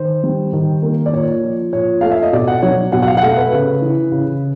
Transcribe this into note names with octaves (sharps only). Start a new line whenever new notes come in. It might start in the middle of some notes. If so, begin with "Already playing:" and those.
Already playing: D#3 C5
G3
D#3
A#3
D5
A#2 C#5
F3
A#2 C#5
A3 F5
E5
D#5
B2 D5
F#5
F#3 C#5
B2 F#5
F#5
F5
F#5
A3 F5
B4
C#3
E3
C#3